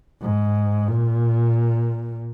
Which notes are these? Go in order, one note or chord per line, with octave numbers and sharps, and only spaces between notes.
G#2
A#2